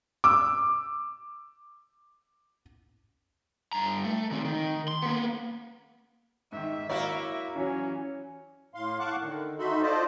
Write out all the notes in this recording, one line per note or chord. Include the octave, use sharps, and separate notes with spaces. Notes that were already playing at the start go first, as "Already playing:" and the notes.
D6 E6
G2 A#5
A3
D#3 C4
D#3
C6
A#3 B3
G#2 D#3 E5
A#3 E4 F#4 A#4 C#5 D5
E3 F#3 C#4
A2 F5 C6
F5 F#5 A5 C#6 D6 F#6
D3 D#3
D#4 F#4 A4 E5 B5 C6
F4 C5 D5 D#5 A5